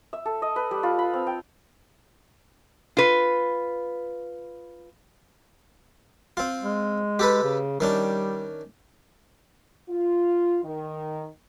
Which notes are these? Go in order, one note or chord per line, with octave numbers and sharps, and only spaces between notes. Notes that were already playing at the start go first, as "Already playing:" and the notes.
E5
A4
D#5
B4
G3
F4
B5
C4
G5
F4 B4
C4 F4
G#3
G4 A4 B4
C#3
D#3 G3 C#4 D4
F4
D#3